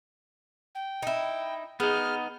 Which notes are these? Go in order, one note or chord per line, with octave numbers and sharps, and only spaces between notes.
G5
D#4 E4
G#3 B3 D#4 F6